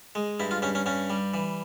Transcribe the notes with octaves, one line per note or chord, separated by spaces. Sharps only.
G#3
G2 E4
F4
G2 C#4
C#4
G2 C#4
G3
E3